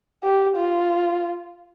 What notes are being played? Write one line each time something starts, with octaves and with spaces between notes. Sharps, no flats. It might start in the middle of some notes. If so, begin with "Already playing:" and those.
G4
F4